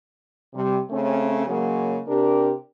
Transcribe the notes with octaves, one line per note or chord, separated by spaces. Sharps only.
C3 G3
C#3 A3 C4 C#4
C#3 F#3 G#3 A#3
C3 D4 G4 A#4